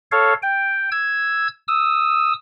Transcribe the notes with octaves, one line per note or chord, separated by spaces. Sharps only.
A4 C#5 F5
G5
E6 G#6
D#6 E6